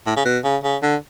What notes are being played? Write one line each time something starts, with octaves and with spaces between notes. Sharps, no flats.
A2
C#3
B2
C#3
C#3
D3